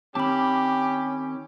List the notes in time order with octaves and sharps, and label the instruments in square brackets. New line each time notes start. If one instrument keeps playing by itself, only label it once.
[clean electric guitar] D#3 C4 A5 [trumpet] C#4 [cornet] G4 [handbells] B5 D6